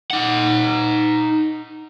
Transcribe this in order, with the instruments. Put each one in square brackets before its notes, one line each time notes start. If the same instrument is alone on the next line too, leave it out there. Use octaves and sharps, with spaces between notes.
[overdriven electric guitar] D#4 F#5